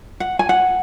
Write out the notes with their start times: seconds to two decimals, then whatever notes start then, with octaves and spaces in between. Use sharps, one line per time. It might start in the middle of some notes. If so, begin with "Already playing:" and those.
0.20 F#5
0.39 G#5
0.49 F#5